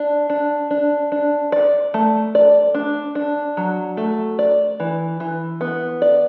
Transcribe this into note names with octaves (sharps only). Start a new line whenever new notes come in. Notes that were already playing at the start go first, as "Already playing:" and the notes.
Already playing: D4
D4
D4
D4
D5
A3
D5
D4
D4
F#3
A3
D5
E3
E3
B3
D5